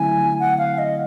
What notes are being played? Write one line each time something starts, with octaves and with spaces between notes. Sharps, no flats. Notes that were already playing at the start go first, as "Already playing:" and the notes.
Already playing: D3 F#3 A3 C4 E4 G#5
F#5
F5
D#5